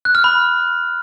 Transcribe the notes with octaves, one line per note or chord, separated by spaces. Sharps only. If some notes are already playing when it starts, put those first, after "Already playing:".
F#6
F6
B5